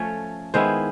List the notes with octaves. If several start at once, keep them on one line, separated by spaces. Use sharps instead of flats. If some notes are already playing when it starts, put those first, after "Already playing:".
Already playing: F3 A3 C#4 C#5
D#3 G#3 B3 E4 C5